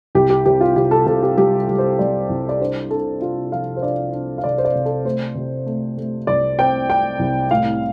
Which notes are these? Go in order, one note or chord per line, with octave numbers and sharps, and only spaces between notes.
C2 G4
G4
C3 G4
F4
C3 G4
A4
C3 A4
G4
G3 G4
G3
C5
G3 D5
C2
D5
D4 C5
D4 A4
D4 F4
F3 F5
C5
D4 D5
D4
F5
C3 D5
C5
D5
C3
A4
A3 C5
C3
A3
A3
C2 D5
C4 G5
C4 G5
C2
A2 F5